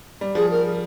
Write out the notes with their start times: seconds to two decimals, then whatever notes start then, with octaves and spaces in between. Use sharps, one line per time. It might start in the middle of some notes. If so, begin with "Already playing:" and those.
0.21 G3
0.35 F3 G#4
0.51 A#4